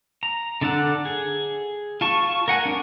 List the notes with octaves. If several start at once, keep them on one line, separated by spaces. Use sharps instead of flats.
A#5
D3 D4 A4 F#5
G#4
F4 A5 C#6
A#4 F#5 G#5
C#4 D4 A#4